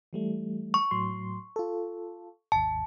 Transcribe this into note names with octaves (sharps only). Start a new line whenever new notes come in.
E3 G3 A3
C#6
A2 F#3 C6
F4 A4
G#1 D#2 A5